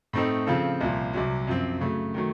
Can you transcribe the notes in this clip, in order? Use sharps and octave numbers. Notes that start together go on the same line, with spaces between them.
A2 A3 C4 D#4 A4
C#3 F3 C4 F4 A4
C2 A#2 F3
C2 C3 F#3
F#2 F3 C4
C#3 F#3 A3
D#3 F#3 A3